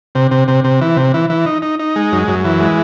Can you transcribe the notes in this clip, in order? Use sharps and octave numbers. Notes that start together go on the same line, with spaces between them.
C3
C3
C3
C3
E3
C3
E3
E3
D#4
D#4
D#4
G#3
F#2
F#2
E3
G#3